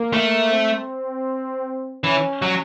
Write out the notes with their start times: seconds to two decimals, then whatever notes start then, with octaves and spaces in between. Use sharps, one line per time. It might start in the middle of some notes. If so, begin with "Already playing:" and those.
Already playing: A#3
0.13 A3
0.51 C4
2.04 E3 C#4
2.42 F#3